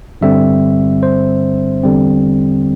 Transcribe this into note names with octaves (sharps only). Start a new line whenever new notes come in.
G2 D3 G3 C4 E5
C5
E2 D3 G3 C4